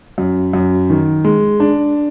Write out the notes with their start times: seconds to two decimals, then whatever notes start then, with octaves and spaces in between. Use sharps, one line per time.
0.18 F#2
0.53 F#2
0.90 D#3
1.25 G#3
1.60 D4